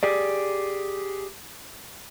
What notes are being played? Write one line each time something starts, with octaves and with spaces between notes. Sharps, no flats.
G4 G#4 D5